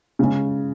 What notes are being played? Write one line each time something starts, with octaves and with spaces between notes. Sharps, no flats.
C#3 G#3 C#4